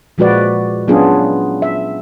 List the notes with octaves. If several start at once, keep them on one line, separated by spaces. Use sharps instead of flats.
A#2 F3 G#3 F#4 B4 D5
F#3 B3 C#4 D4 F4 G#4
E5